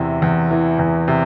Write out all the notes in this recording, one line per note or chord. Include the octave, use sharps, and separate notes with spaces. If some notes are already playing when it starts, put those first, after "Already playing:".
Already playing: E2 C3 E3
E2
E3
E2
C3